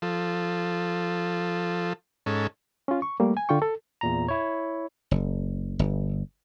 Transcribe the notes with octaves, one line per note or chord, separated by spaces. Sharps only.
F3 A4
G#2 C#4 A4
C#4 F4
C#6
G3 A3 A#3
G#5
D3 F4 G5 C#6
A4
E2 A#2 A#5
E4 C#5
F#1
G1